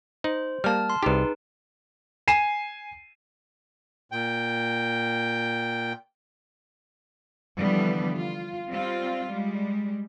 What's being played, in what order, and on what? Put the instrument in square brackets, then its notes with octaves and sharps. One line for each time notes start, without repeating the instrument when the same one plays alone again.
[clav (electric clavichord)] D#4 [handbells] C5
[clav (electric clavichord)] G3 A#3 [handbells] A5 F6
[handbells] C6
[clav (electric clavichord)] C2 G4 [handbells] D#4 G#4 B4
[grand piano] G#5 C7 D#7 E7
[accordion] A#2 G5
[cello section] D3 E3 F3 G3 B3
F4
G3 C4 F4
G3 G#3